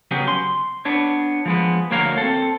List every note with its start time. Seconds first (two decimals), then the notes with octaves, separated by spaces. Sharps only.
0.11 C#3 F#3 B3 G4 G#4
0.28 C6
0.85 B3 D4 C#5
1.46 F3 G#3 B3
1.91 D2 A#3 F#4 C#5 F5 A#5
2.17 C4 A4